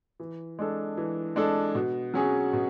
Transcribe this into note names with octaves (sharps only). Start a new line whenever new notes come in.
E3
G#3 D4 A4
E3
G#3 D4 A4
B2
F#3 C#4 G#4
B2